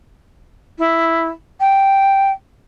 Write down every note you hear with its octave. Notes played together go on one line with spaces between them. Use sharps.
E4
G5